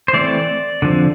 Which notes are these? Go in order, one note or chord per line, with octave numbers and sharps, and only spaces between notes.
C5
E3 A3 C4 D5
D3 F3 C4